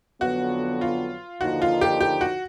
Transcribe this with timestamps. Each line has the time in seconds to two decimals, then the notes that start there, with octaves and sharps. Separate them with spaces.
0.21 F2 D3 F#3 B3 F#4
0.81 F4
1.41 D#2 D3 F3 A#3 D#4 F#4
1.62 F4
1.81 G4
2.01 G4
2.21 F#4